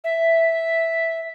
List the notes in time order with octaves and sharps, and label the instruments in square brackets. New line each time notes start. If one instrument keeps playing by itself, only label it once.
[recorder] E5